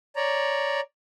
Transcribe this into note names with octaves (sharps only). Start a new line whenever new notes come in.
C#5 D5 A#5